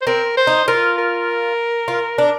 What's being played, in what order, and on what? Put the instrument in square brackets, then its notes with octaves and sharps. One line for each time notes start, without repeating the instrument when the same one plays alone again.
[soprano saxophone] C5
[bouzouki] C4 [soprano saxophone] A#4
[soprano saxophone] C5
[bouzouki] D#4
[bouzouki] F4 [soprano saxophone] A#4
[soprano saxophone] A#4
[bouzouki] F4
D4